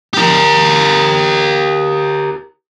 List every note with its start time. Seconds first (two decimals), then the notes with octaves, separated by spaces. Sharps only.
0.14 G4 A#4